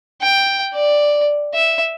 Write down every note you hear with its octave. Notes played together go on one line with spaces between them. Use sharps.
G5
D5
E5